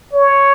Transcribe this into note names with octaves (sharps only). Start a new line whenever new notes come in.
C#5